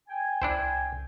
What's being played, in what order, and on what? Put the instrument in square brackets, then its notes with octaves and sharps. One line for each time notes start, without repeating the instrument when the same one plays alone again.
[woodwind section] G5 G#5
[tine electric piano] C2 [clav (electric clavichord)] D4 E4 C5